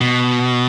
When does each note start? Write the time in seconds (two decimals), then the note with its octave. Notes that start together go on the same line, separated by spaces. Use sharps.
0.01 B2